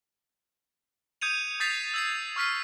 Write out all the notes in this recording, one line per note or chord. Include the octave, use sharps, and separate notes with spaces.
D#6 G6 G#6 C#7 D#7 F7
D#6 G6 A6 B6 C7 F7
E6 G#6 C7
C#6 F6 B6 C7